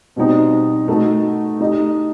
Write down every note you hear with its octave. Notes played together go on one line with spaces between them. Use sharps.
B2 G3 C4 D#4
A3 D#4 F#4 A4
A3 D#4 G4 D#5